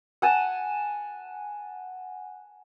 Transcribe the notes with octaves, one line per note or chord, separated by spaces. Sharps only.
F#5 G#5 A5